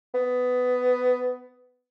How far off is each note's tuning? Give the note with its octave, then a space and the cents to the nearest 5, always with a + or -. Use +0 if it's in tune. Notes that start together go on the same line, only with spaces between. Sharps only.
B3 +15